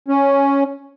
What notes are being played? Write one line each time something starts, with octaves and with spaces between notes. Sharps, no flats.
C#4